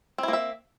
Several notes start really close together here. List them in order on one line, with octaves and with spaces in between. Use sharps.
C4 E4 A#3 E5